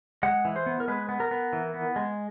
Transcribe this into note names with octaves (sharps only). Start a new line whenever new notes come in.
G#3 F#5
E3
C5
B3
A#4
G#3 B4
B3
A#4
B3
E3
B3
G#3